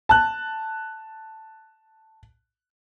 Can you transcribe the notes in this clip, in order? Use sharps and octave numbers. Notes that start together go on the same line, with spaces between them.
A5 F#6